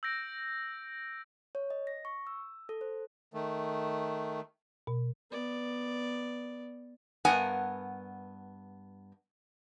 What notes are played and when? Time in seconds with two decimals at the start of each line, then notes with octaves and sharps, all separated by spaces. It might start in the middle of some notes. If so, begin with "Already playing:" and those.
0.03 E6 G6 A#6 D7
1.55 C#5
1.70 D#5
1.87 A#6
2.05 C#6
2.27 E6
2.69 A4
2.81 C5
3.34 D#3 A3
4.87 B2
5.31 B3 D5
7.25 G2 B3 A#4 F#5 G#5